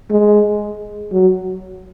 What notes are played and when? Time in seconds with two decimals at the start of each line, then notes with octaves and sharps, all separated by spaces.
0.10 G#3
1.12 F#3